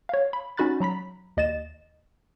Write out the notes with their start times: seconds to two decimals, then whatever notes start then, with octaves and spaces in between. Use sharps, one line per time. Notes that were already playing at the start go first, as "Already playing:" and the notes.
0.09 C#5 F5
0.33 B5
0.57 C#4 D#4 F#4 B5 F#6 A6
0.80 F#3 A#5 B5 B6
1.37 D#2 D#5 A6 E7